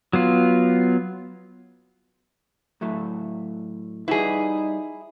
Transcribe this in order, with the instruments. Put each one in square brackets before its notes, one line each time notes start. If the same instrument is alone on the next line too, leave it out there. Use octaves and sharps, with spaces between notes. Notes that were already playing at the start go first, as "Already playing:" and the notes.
[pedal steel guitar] F#3 B3 F4
[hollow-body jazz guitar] A2 F#3 A3
[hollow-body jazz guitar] G3 F#4 B4 [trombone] D#4 [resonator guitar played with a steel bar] E4 G#4